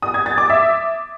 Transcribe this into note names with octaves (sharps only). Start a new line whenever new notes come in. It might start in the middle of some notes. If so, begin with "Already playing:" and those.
D#6
G#6
A6
D6
E5